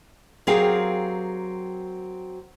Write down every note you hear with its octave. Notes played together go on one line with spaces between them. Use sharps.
F#3 C4 G4 G#4 A#4 F5